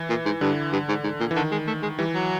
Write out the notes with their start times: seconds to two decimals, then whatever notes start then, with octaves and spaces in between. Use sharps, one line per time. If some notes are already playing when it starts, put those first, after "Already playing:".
Already playing: E3
0.10 A#2
0.26 G#2
0.41 G2 D3
0.73 G2
0.89 G#2
1.04 G#2
1.20 A#2
1.31 E3
1.36 D3 D#3
1.52 G#3
1.67 A3
1.83 G#3
1.99 E3 G3
2.14 F#3